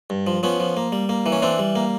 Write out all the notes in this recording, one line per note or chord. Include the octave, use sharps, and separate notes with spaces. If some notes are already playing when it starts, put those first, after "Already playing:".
G2
F3
F3 B3 C#4
F3
A#3
G3
A#3
E3
C#4
E3 C4 D4
G3
A#3